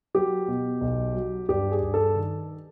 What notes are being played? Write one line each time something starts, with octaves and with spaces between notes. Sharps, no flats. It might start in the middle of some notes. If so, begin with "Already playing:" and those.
F#3 G4
B2
B1
F#3
G2 G4
G#4
G2
A4
D#3